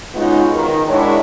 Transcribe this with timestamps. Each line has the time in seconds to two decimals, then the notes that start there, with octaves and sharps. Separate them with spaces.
0.14 G#3 B3 C#4 D#4 F4 F#4
0.53 D#3
0.87 G#3 D4 E4 F#4 A#4 C#5